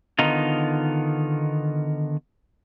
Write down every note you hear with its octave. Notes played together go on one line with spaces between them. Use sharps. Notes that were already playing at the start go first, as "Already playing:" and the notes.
D3 D#3 B3 D#4 F4